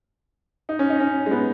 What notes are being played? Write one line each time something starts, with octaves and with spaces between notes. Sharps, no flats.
D#4
C#4
D#4
C#4
G#3
B3